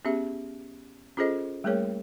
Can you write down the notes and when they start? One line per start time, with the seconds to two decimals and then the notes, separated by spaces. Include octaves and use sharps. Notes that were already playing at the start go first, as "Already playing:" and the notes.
0.05 B3 C#4 G4 G#4 E5
1.17 C#4 F4 G#4 A4 C5 D#5
1.64 G3 A3 A#3 G#4 A#4 C#5